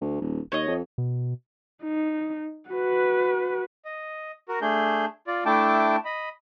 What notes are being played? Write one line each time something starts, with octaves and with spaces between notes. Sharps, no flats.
D2
D#1
D#2 C#5 D#5
F2
B2
D#4
F#4 B4
D#5
F#4 A#4
A3 D4 G#4 G6
F4 D5
A3 D4 E4 G5 A5 D6
D#5 B5